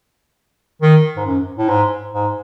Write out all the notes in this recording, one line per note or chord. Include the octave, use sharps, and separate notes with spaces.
D#3
G#2
F#2
A2
G#2
G#2